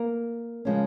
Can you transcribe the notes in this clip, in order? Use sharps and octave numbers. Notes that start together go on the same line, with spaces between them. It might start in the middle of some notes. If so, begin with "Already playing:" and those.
Already playing: A#3 A#4
C#3 F3 G#3 C#4